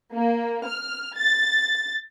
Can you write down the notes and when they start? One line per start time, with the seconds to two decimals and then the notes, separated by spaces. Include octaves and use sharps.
0.13 A#3
0.66 F6
1.17 A6